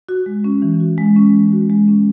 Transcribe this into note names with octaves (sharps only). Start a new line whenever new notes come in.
F#4
G#3
C#4
E3
F#4
G#3
C#4
E3
F#4
G#3
C#4